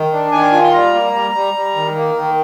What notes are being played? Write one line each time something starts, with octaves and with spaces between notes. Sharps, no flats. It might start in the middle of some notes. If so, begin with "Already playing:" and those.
Already playing: D#3
D4
D#3 G#5
F4
C6
G3 A#5
A#3
G3
G3
G3
D#3
A#3
D#3